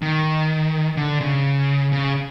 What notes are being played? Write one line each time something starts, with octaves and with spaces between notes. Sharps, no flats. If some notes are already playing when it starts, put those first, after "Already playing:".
D#3
D3
C#3
C#3